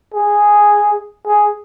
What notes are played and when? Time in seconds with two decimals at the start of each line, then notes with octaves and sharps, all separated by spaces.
0.14 G#4
1.27 G#4